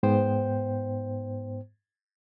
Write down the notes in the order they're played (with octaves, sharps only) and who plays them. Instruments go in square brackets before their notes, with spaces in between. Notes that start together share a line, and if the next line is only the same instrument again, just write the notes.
[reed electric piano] G#2 B3 C5 G5